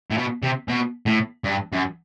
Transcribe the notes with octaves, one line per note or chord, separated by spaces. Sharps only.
A2
B2
C3
B2
A2
G2
F#2